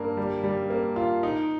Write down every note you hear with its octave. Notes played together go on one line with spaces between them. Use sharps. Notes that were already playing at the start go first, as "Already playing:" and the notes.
Already playing: G2 A#3
G3
G3
A#3
F4
D#4